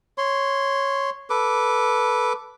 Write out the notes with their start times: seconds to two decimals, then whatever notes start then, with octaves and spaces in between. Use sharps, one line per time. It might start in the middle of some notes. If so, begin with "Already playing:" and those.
0.18 C#5 C6
1.30 A4 B4 D6